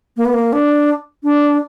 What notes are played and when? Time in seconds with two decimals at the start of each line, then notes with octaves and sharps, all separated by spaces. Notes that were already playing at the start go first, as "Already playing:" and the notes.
0.17 A#3
0.25 B3
0.33 A#3
0.53 D4
1.23 D4